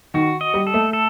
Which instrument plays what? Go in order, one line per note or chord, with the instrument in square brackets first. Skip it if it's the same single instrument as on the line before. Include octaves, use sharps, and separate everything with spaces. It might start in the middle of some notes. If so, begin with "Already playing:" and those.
[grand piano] D#3 [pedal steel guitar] F#4
[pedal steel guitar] D#5
[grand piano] G3
[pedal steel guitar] A4
[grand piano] A3
[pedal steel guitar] A4